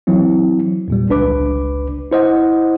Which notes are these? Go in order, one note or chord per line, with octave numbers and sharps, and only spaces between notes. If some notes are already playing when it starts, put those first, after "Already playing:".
E3 F#3 C4 E4
E2 A#2 G3
G1 C#2 D4 B4 D6
E4 C5 D#5 F#5